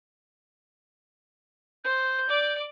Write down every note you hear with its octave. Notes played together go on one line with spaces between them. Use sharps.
C5 G6
D5 D6